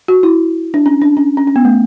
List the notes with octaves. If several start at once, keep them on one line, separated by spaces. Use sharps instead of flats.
F#4
E4
D4
C#4
D4
C#4
C#4
C#4
B3
A3